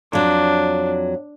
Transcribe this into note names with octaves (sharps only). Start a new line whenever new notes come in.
F2 F#3 D4